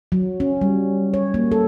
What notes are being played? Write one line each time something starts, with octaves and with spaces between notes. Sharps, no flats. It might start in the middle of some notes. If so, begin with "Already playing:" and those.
F#3
C#4
G3
C#5
A#3
A4